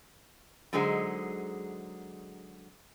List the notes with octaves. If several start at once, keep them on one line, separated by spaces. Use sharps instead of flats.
D3 F#3 G#3 D#4 G#4 C5